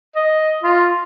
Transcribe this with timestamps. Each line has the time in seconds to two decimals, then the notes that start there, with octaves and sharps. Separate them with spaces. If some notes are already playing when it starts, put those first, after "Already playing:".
0.15 D#5
0.63 F4